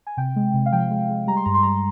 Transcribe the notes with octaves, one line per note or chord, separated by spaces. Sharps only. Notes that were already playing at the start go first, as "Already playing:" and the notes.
G#5
C3 G5
G#3
C3
F5
F3 G5
G#3
G#3
G3 A#5
C6
G2 A#5
C6
G3 A#5